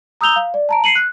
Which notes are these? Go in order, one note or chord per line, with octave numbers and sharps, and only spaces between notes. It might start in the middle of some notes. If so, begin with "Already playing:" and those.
A#5 D#6 E6 G6 F7 G7
F5
D5
A5 A#5 D7
C7 C#7 D#7 F#7
F#6